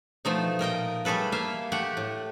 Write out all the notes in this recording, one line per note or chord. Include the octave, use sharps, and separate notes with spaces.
B2 F3 A3 D#4
A#2 A#4 D#5 G5
G3 A3 G#4 A4 B4
A#3 E5 F5
A3 G4 F#5
A2